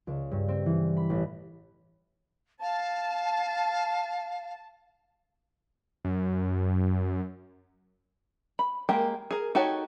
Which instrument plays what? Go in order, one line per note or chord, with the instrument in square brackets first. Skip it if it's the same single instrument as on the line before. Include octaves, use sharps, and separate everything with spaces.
[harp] C#2
G2
C4
E3
B5
A1
[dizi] F5 [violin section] A5
[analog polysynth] F#2
[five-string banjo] B5
G#3 A#3 G4 A#4
G#4 A#4
D#4 F#4 G4 A4 C#5